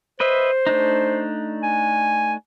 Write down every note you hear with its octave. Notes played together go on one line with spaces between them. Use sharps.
B4 C5 D#5 E5
A3 D4 D#4
G#5